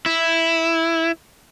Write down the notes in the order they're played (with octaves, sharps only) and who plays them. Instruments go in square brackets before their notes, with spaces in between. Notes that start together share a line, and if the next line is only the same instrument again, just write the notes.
[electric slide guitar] E4